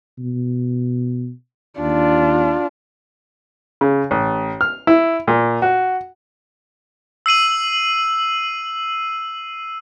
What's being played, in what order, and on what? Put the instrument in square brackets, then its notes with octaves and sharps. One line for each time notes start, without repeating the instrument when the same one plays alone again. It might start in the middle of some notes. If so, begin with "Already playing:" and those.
[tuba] B2
[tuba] D#2 [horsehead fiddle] D4 F4
[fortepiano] C#3
A1
F6
E4
A#2
F#4
[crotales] E6 C7 D#7 F#7